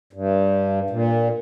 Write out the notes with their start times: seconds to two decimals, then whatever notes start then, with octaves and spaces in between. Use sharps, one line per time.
0.13 G2
0.90 A#2